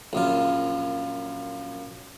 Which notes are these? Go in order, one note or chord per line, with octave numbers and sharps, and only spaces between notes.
A#1 F#2 F4